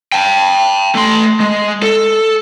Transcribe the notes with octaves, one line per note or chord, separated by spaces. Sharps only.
G5 A5
A3 C6
G#3
A4